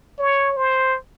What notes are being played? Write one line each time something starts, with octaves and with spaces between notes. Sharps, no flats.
C#5
C5